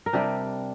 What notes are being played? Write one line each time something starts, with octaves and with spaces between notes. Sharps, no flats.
A#4
C3 G3 D4 G4